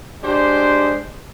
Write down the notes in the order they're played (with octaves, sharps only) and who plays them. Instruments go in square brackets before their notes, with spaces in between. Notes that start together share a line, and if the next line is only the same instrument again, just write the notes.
[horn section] G#3 D4 G4 C5